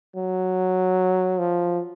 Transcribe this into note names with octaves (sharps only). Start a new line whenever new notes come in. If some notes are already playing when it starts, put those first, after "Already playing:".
F#3
F3